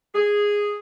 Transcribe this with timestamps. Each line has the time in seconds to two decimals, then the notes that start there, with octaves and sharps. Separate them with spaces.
0.14 G#4